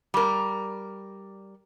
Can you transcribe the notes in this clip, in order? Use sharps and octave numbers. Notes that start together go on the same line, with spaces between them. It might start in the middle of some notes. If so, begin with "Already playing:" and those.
G3 A#4